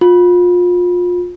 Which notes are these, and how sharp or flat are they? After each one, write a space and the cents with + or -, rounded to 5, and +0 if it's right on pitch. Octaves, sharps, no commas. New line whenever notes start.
F4 +30